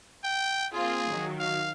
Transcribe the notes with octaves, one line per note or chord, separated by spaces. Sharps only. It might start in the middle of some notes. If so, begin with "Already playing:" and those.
G5
A#3 C4 F4 G#4
D#3 F#3
F5